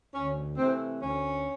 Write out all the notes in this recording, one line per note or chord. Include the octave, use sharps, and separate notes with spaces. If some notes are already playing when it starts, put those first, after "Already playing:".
D2 C#4
C3 E3 A3 C4
D2 C#4